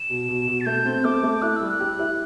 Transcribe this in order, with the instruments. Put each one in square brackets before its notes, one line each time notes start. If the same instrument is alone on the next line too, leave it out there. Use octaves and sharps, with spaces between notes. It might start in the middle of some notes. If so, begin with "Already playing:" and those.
Already playing: [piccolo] E7
[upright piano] B2
B2
B2
[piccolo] A6
[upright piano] A3 [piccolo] G6
[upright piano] C4
[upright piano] A3 [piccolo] D6
[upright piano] A3
[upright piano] E4 [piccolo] F#6
[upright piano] G3 [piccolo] E6
[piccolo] F#6
[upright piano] G4
E4